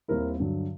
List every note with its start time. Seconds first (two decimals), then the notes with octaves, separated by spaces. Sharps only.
0.08 D#2 D#3 G3 C4 E4 A#4
0.40 G2 D3 F#3